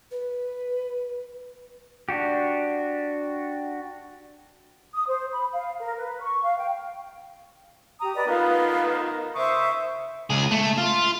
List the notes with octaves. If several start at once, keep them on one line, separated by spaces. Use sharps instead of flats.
B4
D4 F#4 G4
D#6
C5
B5
F5
A#4
B4
C#6
F5
G5
G4 A#5 D#6
B4 D5 D#5
B3 D#4 F4 A#4 B4
C5 E5 C#6 D#6
C#2 G#4
A3
F4